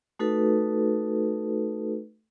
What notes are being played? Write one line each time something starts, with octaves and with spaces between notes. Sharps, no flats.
A3 D#4 F#4 A4 B4